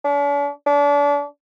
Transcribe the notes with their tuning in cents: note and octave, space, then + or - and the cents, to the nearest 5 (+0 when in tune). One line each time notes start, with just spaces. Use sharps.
D4 -45
D4 -35